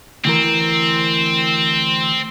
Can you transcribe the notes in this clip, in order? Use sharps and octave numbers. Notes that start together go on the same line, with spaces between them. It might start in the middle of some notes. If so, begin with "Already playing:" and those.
D2 E3 C4 A#4